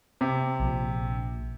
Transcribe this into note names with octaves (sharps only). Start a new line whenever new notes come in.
C3
A#1